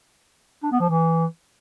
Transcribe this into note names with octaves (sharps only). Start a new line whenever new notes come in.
D4
B3
F3
E3